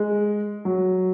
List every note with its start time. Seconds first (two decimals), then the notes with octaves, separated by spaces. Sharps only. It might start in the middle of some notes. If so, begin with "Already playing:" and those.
Already playing: G#3
0.65 F#3